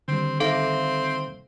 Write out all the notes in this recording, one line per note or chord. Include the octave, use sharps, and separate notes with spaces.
D3 D#3 G3 C4
C4 D#4 A4 E5 F5